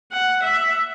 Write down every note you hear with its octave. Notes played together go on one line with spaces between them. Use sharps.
F#5
E5